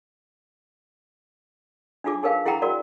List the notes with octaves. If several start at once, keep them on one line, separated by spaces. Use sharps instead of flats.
D4 D#4 F4 G#4 D6
D#4 G#4 A#4 B4 F5
E4 G#4 F#5 G5 A#5 B5
F#4 A#4 D5